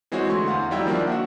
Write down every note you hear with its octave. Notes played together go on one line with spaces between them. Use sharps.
E3 G#3 C4 E4 F#4 C#5
D3 A3 E4 C6 C#6
E2 F5 F#5 C6
F#3 G3 D#4 E4 G5 E6
D#3 F3 A#3 D4
F#4 E5 F#5